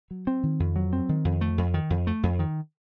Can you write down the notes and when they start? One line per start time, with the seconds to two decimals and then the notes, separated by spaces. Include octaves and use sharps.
0.11 F#3
0.27 C4
0.43 D#3
0.60 F2
0.76 F#3
0.93 C4
1.09 D#3
1.25 F2
1.41 A3
1.58 F2
1.74 D#3
1.90 F2
2.07 A3
2.23 F2
2.39 D#3